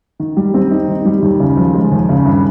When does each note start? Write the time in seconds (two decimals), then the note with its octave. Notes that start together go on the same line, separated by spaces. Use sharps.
0.20 D#3
0.37 G3
0.54 C4
0.71 D#4
0.88 D#3
1.05 G3
1.22 D#2
1.40 C#3
1.57 F3
1.74 G#3
1.92 D#2
2.09 C#3
2.26 G2